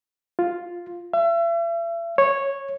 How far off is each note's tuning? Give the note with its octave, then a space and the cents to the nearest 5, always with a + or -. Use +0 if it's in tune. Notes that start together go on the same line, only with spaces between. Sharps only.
F4 +0
E5 +40
C#5 -10